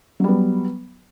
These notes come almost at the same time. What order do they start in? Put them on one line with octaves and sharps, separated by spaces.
F#3 G3 B3